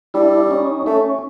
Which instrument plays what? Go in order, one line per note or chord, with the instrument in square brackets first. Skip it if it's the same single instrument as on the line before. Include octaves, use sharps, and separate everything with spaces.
[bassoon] G3 [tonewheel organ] D4 E4
[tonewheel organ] C#4 D#4
[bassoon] A3 [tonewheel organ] C#4